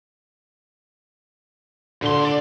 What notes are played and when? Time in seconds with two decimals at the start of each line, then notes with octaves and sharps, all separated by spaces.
2.02 A#2 D3 C6
2.25 D5